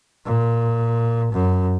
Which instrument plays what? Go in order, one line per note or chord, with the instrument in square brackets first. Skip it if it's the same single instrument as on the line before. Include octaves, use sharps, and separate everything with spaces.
[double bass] A#2
F#2